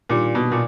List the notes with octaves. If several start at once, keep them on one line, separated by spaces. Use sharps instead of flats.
A#2 D#3 G3 A#3 D4 F4
B2
A#2